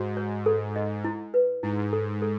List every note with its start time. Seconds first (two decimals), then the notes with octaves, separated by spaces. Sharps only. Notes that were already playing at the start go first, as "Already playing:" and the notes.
Already playing: G#2 F#4
0.17 C#5
0.46 A4
0.76 D#5
1.04 E4
1.34 B4
1.63 G#2 E4
1.93 A4
2.22 A4